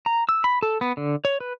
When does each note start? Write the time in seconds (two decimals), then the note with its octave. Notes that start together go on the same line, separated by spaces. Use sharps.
0.06 A#5
0.29 E6
0.44 B5
0.63 A4
0.81 B3
0.97 D3
1.25 C#5
1.40 B4